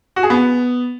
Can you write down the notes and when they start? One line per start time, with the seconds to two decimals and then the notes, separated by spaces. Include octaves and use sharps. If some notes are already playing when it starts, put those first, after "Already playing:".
0.16 F#4
0.23 G#4
0.30 B3